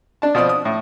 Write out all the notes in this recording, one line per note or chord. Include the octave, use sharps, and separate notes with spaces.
D4 A5
B2 F3 D5 D#6
D#6
A2